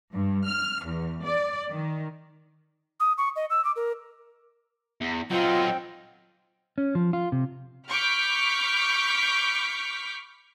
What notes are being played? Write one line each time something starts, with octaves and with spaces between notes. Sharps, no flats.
G2
F6
E2
D5
D#3
D#6
C#6
D#5
E6
D6
A#4
E2
F#3 C4 D#4 F4 G5
C#4
F3
F4
C3
B5 C#6 D6 F6 G6 B6